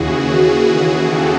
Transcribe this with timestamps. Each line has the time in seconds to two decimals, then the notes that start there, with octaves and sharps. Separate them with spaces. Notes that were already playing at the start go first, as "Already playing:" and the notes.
Already playing: D#2 C#3 E3 F#4 G#4
1.03 G4 A4